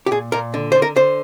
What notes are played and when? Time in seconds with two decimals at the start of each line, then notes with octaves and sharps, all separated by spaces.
0.06 G4
0.11 A#2 G#4
0.32 A#2 A#4
0.54 D3
0.72 D3 C5
0.82 A#4
0.96 D3 C5